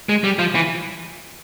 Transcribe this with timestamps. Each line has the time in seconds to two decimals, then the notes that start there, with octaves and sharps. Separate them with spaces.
0.09 G#3
0.24 G3
0.39 F3
0.55 E3